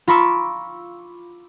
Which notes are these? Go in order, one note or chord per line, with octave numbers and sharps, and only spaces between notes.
F4 A#5 B5 C#6 D6 E6